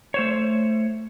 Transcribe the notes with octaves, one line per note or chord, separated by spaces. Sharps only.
A3 C5 C#5